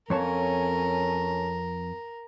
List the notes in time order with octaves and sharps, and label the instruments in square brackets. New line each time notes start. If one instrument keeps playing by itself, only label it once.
[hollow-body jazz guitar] F2 C#5 A5 [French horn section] F#3 C#4 A4 [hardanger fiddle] A#4